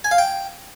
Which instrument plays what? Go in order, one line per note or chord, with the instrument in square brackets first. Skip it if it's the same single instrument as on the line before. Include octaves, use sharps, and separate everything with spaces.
[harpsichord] G#5
F5
G5